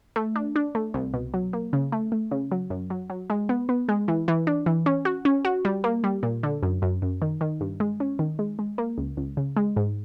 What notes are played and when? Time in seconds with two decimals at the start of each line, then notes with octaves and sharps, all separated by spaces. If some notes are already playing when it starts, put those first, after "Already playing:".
0.16 A3
0.36 D4
0.56 D4
0.75 A3
0.94 C2
1.14 B2
1.34 F#3
1.53 A#3
1.73 C#3
1.92 A3
2.12 A3
2.31 C#3
2.52 F#3
2.70 F#2
2.90 F#3
3.10 F#3
3.30 G#3
3.49 B3
3.69 B3
3.89 G#3
4.08 E3
4.28 E3
4.47 D4
4.66 E3
4.86 C#4
5.05 F#4
5.25 C#4
5.45 F#4
5.65 G3
5.84 A#3
6.04 G3
6.23 A#2
6.43 D3
6.63 F#2
6.82 F#2
7.02 F#2
7.22 D#3
7.41 D#3
7.61 G2
7.80 G#3
8.00 C#4
8.19 D#3
8.39 G#3
8.59 G#3
8.78 A#3
8.98 C#2
9.17 C#2
9.37 C#3
9.57 G#3
9.76 G#2